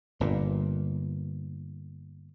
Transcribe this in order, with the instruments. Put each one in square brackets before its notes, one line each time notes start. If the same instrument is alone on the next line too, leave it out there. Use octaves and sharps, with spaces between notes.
[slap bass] G1 A#2